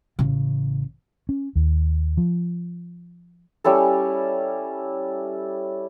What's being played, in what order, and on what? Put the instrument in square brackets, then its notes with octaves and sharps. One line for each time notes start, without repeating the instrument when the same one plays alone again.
[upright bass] A1 C#3
[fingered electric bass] C#4
D#2
F3
[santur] G3 C#4 E4 A4